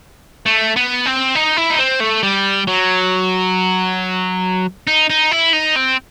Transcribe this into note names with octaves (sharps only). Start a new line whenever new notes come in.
A3
B3
C4
D#4
E4
D#4
C4
A3
G3
F#3
D#4
D#4
E4
D#4
C4